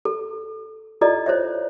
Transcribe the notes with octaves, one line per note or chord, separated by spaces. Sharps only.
A4
E4 F4 A4 D5 D#5
C5 C#5 E5